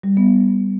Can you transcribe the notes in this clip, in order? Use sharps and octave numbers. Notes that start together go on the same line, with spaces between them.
G3
B3